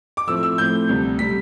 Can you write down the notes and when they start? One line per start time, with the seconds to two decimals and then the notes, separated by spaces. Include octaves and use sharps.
0.17 D6
0.27 A2 F3 A3 C4 E6
0.43 E6
0.58 A2 F3 A3 C4 G6
0.89 D2 C3 G3
1.19 C3 G3 B6